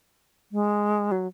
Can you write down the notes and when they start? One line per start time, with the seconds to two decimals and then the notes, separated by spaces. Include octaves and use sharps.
0.52 G#3
1.12 F#3